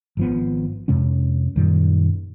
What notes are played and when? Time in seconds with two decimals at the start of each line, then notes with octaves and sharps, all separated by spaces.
0.17 G#1 F3 B3
0.88 F2 C3 G#3 C#4
1.56 F#2 A#2 D#3 G3